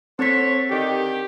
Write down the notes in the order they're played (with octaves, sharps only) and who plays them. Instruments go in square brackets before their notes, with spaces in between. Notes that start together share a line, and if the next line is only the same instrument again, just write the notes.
[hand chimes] C4 B6 [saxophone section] A4 C5 C#5
[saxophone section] D3 D#3 [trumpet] G4